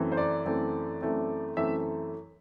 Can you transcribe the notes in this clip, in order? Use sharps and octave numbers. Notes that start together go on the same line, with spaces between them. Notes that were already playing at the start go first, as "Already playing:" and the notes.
Already playing: F#2 E3 A3 C4
C5
D5
F#2 E3 A3 C4
F#2 E3 A3 C4
F#2 E3 A3 C4 E5